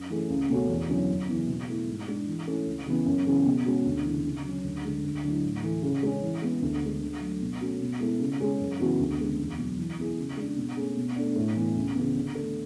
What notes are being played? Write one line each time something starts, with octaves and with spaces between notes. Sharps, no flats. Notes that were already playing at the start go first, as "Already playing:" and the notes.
Already playing: F#2
E3 A3 C#4 G#4
C#2
B2 A3 C#4 F#4
E2
D3 F#3 C#4 E4
F#2
C#3 E3 B3
B2
A3 E4
G#2
G#3 D4
E3
A3 C#4 E4 A4
C#2
C#3 E3 B3
F#2
C#3 E3 B3
B2
G#3 C#4 F#4
D2
C#3 E3
C#3
F#3 C#4
D2
D3 G#3
D2
D3 F#3 A3 E4
A2
E3 A3
C#3
G#3 C#4
E3
G#3 B3
D2
D3 G#3
D3
F#3 A3
B2
A3 C#4 F#4
B2
G#3 B3 E4 A4
C#3
G#3 C#4 G#4
F#2
C#3 E3 B3 F#4
D2
C#3 G#3 B3
E2
B2 F#3
E3
B3 E4 G#4
C#3
G#3 D4
B2
A3 C#4 G#4
B2
A3 D4
A2
E3 B3
C#2
C#3 E3 B3
D3
A3 D4 A4